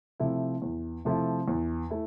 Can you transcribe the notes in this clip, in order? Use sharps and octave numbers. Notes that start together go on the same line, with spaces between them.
C3 F3 A3 E4
E2
C3 F3 A3 E4
E2
A3 E4